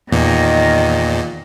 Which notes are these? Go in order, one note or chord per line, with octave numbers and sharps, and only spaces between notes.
E2 A#2 D#3 D#5